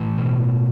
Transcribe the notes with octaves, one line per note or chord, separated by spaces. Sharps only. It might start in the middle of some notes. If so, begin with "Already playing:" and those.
Already playing: A2 E3
B2